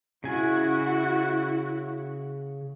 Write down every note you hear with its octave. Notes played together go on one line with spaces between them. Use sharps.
C#3 E4 F#4 G#5